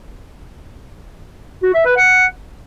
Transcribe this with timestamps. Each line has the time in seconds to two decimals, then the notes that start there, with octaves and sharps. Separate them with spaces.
1.63 F#4
1.74 E5
1.85 B4
1.96 F#5